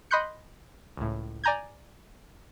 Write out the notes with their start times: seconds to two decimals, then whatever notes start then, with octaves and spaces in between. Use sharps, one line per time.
0.11 D#5 B5 C6 F#6 G6 C#7
0.97 C#2 A2
1.44 D5 G#5 A#5 G6 G#6